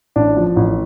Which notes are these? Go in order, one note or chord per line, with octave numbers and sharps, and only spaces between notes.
A1 D4
F3
A1